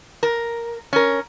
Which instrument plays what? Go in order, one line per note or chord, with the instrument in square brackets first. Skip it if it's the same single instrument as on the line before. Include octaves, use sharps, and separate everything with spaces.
[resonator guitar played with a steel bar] A#4
C#4 A#4